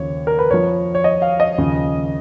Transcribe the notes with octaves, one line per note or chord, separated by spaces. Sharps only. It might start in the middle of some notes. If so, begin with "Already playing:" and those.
Already playing: D#2 C#3 F3 C#5
A#4
B4
F2 F3 C#5
C#5
D#5
F5
D#5
D#2 C#3 F3